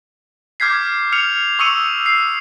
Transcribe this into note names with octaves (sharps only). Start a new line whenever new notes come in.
D6 F6 G6 G#6 B6 C7
F6 C#7 F7
C#6 D#6 E6 C#7 D#7 F7
C7